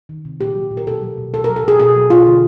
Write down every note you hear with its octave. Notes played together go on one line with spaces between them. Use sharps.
D#3
C3
A#2 G4
F#3
A#2
A#4
B2 A4
F#3
B2
B2 A4
A#4
F#3
A4
B2 G#4
B2 G#4
F#3
B2 F4
D3